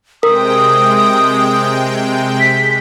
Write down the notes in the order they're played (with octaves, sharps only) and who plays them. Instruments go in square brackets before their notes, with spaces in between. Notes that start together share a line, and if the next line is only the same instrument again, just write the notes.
[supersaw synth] C3 G#3 G5 [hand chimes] A#4 [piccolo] D#6
[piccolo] B6